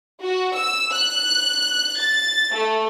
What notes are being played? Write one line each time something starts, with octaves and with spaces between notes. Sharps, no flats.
F#4
E6
F#6
A6
A3